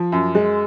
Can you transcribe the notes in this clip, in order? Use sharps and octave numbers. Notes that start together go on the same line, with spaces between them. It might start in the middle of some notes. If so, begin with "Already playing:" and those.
Already playing: F3
F#2
G#3